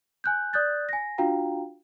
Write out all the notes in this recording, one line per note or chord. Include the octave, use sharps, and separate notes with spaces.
G#5 F#6 G6
D5 D#6 F#6 G6 A6
G#5 A#6
D4 F4 F#4 F5 G5 A#5